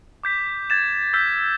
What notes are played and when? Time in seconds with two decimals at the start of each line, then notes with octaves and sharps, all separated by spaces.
0.24 D6 G6 B6
0.70 G#6 A6 E7
1.13 E6 F6 G6 B6